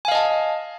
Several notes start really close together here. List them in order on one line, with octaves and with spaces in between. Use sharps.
G#5 F5 D#5 A5